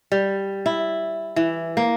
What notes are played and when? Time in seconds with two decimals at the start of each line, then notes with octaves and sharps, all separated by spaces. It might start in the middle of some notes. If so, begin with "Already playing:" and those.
0.12 G3
0.66 E4
1.36 E3
1.77 A#3